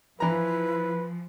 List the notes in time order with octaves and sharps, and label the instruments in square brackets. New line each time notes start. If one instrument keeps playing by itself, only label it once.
[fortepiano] E3 A#5 [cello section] F3 [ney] E4 [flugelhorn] B4